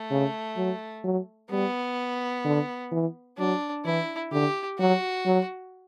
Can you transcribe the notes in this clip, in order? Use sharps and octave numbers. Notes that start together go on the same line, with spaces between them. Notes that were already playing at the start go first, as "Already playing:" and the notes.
Already playing: A3
C#3
F#3
F#3
G3 B3
D3
E3
F#3 D4
E3 E4
D3 G4
F#3 F#4
F#3